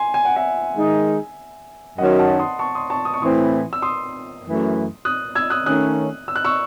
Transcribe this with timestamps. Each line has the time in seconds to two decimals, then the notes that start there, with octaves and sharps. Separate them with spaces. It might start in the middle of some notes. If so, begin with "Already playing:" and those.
Already playing: G#5 C6
0.14 G#5
0.25 F#5
0.36 E5 G#5
0.75 D#3 G#3 D#4
1.98 F#2 D#3 F#3 D#5 F#5
2.19 F#5 A5
2.39 C6 D#6
2.59 A5 C#6
2.75 C6 D#6
2.90 A5 C#6
3.05 D#6
3.14 C#6
3.21 A2 E3 C4 C6 D#6
3.73 E6
3.82 C6 D#6
4.43 F#2 E3 A3
5.05 D#6 F#6
5.35 E6 G#6
5.50 D#6 F#6
5.66 D#3 A3 C#4 D#6 F#6
6.28 E6
6.36 F#6
6.45 C#6 E6